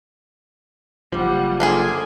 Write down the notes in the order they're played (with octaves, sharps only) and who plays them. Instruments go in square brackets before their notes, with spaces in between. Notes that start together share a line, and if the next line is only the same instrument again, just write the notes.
[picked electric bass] F#1 B1 F3 [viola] G3 F#5
[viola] D3 G#5 [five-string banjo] A#3 F4 G#4